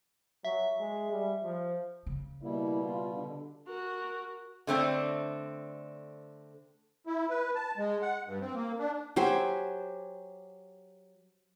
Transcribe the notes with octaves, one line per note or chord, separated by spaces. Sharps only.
F#3 E5
G#3
G3
F3
C#3
B2 G3 A#3 E4
F4
D3
F#4 A#4
D3 A3 C4 D4
E4
B4
A5
G#3
F#5
G2
C4
A#3
D4
F#3 G4 C5 G#5